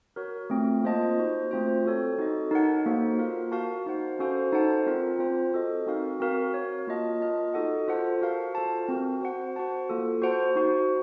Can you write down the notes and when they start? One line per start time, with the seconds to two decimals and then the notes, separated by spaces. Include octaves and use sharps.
0.16 F#4 A#4 C#5
0.50 A3 C4 F4
0.84 A#3 F4 C5 D#5 A5
1.17 D#4 F#4 C5
1.51 A3 C4 F4 C5
1.85 C4 F#4 A4 C#5
2.19 D#4 F#4 A4 D#5
2.51 D#4 A#4 C#5 F#5 A5
2.86 A#3 D#4 F#4 A4 C5
3.19 F4 A#4 F5
3.52 F#4 A#4 F5 A5
3.86 D#4 F#4 C5 F#5
4.19 C#4 F#4 A4 C5 F5
4.52 D#4 A4 C5 F#5 A5
4.87 C4 F4 A#4
5.19 C4 F4 C5
5.53 F#4 A4 D#5
5.86 C4 D#4 F#4 A#4 F5
6.20 C4 F#4 A#4 F5
6.54 F#4 A#4 C#5
6.87 A#3 F4 A#4 D#5 A5
7.21 F4 A#4 D#5 A5
7.54 D#4 F#4 A4 D#5 F#5
7.88 F4 A4 C5 F#5 A5
8.22 F#4 A#4 F5 A5
8.55 F4 A4 C5 F5 A5
8.88 C4 F#4 A#4
9.21 F#4 C5 F#5
9.56 F#4 C5 F#5 A5
9.90 A#3 F4 A4
10.22 F#4 C5 F#5 A5
10.55 D#4 F#4 C5